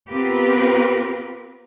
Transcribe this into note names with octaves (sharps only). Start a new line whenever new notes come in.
B3 C4 F4 G4 A#4 B4